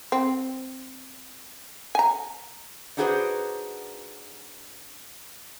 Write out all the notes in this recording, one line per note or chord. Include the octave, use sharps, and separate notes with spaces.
C4
G#5 A#5
D4 D#4 F#4 G#4 B4 C5